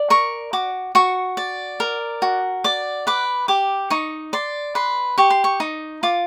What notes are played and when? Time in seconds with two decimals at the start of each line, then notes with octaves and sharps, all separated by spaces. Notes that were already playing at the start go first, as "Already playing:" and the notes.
Already playing: D5
0.10 A#4 C#6
0.53 F#4 D6
0.95 F#4 C#6
1.37 D5
1.80 A#4
2.22 F#4
2.64 D5 D6
3.07 B4 D6
3.48 G4 D6
3.90 D#4 C#6
4.33 D5 C6
4.75 B4 C6
5.18 G4 C#6
5.30 C6
5.44 C#6
5.60 D#4
6.03 F4 D6